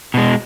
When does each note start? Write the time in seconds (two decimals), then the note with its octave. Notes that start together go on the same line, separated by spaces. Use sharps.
0.14 B2 G#3